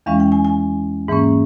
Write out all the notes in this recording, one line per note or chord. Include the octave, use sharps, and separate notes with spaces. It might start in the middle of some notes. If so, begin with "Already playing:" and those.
E2 E3 G#3 C#4 F5
G5
G#5
G#5
G#2 E3 A#3 C#4